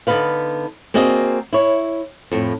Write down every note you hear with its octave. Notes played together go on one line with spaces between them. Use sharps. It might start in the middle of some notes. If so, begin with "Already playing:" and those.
D3 B3 D#4 B4 F5
A#3 C4 F#4 G#4 D5 D#5
E4 C#5
F2 A2